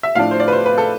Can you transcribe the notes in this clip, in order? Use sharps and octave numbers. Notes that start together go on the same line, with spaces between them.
E5
A2 F3 A3 D4 F5
C5
D5
B4
C5
B4
A4